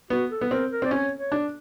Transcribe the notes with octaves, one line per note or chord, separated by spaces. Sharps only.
B3 F#4
A4
B3
C4 A#4
A#4
C4 D5
C#4 C#5
C#5
D4